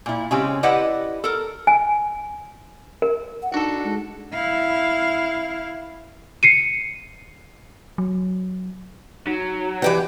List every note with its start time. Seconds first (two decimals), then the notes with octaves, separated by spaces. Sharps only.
0.06 A#2 E4
0.31 C#3 G#3 C4 C#4 G4
0.63 E4 G4 B4 D5 D#5 F#5
1.24 A4 A#4
1.67 G#5
3.02 A#4
3.43 F#5
3.54 D4 D#4 F#4 A4
3.84 G#3
4.34 E4 F5
6.43 C7 C#7 D#7
7.98 F#3
9.27 F#3 D#4
9.82 E3 G4 B4 D5 F#5